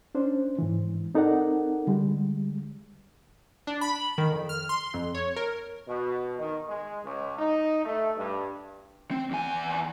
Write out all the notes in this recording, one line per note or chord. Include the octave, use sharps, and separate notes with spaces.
C#4 D4 C5
G#2 E3
C4 D#4 A4 A#4 D5 F#5
D3 G3 G#3
D4
B5
D#3
F2
F6
C6
F2
C#5
A#4
B2
D#3
G#3
C#2
D#4
A3
G2
C4
E2 G#5